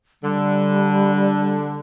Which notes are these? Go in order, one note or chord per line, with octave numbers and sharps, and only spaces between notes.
D3 G3